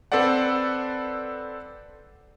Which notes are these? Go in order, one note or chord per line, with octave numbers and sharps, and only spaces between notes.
C4 A4 B4 C5 D5 F#5